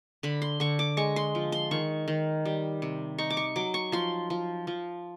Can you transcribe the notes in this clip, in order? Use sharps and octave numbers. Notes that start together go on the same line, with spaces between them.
D3 B5
C6
D3 C#6
D6
G#3 C#6
C6
F3
C6
D#3 C#6
D#3
G3
C3
D#4 C#6
D6
C#6
F#3 D6
C#6
F3 C6
F3
F3